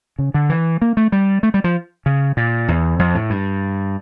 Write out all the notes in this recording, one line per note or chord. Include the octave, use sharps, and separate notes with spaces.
C#3
D3
E3
A#3
A3
G3
A3
G3
F3
C#3
A#2
E2
F2
A2
G2